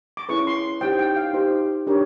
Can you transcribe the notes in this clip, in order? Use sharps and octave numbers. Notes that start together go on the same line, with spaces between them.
D6
C#4 E4 G#4 B4 C#6
C6
D#4 G4 C5 G5
G5
F5
D#4 G4 C5
D4 G4 A#4 C#5